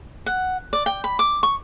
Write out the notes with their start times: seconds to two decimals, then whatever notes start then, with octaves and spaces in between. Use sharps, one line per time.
0.26 F#5
0.73 D5
0.86 G5
1.04 B5
1.19 D6
1.43 C#6